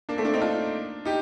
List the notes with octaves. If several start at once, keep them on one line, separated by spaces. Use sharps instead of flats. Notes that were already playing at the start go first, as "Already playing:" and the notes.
A#3 D4
A3 C4
A#3 D4
C4 D#4
D4 F4
D#4 G4